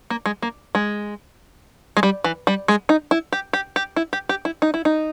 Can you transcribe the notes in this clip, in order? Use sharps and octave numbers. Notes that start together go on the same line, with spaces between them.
A#3
G#3
A#3
G#3
G#3
G3
E3
G3
G#3
D#4
E4
G4
G4
G4
E4
G4
G4
E4
D#4
E4
D#4